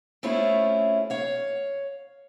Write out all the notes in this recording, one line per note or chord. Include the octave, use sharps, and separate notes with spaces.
A3 C4 C#4 E4 F4 G#4
C#5 F5